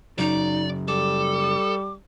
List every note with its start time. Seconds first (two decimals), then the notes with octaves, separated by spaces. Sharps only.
0.18 F#2 C#3 F#3 D#4 D5
0.88 G3 A4 D6